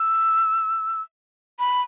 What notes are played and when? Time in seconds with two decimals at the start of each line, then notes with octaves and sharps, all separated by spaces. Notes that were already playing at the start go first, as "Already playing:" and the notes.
Already playing: E6
1.59 B5